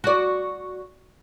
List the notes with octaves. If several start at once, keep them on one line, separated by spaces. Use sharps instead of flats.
F#4 D5